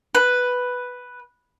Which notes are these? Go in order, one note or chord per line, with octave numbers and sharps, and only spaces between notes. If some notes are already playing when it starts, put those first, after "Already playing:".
B4